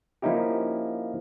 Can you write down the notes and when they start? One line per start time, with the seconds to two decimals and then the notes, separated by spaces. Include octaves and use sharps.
0.22 F3 A#3 C#4 D#4 E4 G4